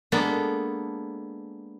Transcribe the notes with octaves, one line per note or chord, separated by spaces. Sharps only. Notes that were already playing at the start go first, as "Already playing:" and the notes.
G#3 A#3 B3 D4 A4